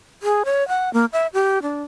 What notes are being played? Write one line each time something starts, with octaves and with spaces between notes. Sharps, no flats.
G#4
C#5
F#5
A#3
E5
G4
D4